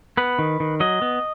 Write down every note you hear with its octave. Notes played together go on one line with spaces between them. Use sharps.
B3 B4
D#3
D#3
F#3 D#5
B3